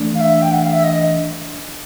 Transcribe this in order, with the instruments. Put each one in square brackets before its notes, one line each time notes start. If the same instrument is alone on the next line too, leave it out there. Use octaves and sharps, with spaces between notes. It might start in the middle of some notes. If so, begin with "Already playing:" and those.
Already playing: [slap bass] E3 A3 D4
[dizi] F5
E5
G5
F#5
F5
E5
D#5